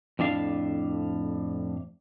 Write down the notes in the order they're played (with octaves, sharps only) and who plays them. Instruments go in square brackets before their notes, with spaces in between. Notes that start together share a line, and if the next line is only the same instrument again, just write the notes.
[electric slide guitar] F2 A2 D4 F5